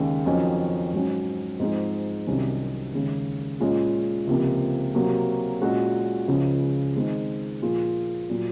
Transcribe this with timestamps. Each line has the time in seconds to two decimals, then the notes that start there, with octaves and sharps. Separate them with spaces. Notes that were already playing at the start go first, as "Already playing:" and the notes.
Already playing: D#2 C#3 G#3 C#4
0.26 F2 D#3 F#3 C#4
0.93 G#2 F#3 C#4
1.60 G#2 F3 C4 D#4 G#4
2.27 C2 C3 D#3 F#3 C#4
2.93 D#2 C#3 G#3
3.60 A#2 G#3 C#4 F4
4.27 C#2 C3 F3 A#3
4.95 C3 F#3 A#3
5.61 A#2 G#3 C#4 F#4
6.28 C#2 C#3 F3
6.95 D#3 G#3 C4 D#4
7.62 A#2 F3 A#3 F4 G#4
8.30 A#2 F#3